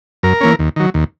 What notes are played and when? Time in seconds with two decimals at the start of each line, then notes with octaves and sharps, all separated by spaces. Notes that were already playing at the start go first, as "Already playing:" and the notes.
0.23 F#2 A#4
0.41 E3 A#3 C#4
0.59 D#2
0.76 D#3 F#3
0.94 D#2